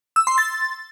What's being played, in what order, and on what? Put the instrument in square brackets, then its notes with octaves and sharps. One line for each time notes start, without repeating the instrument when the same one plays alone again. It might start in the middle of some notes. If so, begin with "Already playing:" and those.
[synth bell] E6
C6
A6